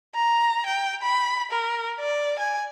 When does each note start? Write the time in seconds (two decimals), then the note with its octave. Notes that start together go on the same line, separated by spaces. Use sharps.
0.15 A#5
0.66 G5
1.03 B5
1.51 A#4
2.00 D5
2.39 G#5